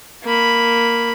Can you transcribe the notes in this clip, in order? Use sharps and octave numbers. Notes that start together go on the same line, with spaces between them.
A#3 B5